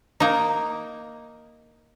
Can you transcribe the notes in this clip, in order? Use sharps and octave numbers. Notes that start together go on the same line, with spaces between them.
A#3 D#4